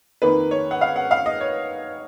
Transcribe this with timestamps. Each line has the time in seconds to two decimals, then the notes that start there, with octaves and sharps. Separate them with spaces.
0.22 F2 D#3 A#3 D#4 B4
0.51 C#5
0.71 F#5
0.81 F5
0.96 F#5
1.11 F5
1.26 D#5
1.41 C#5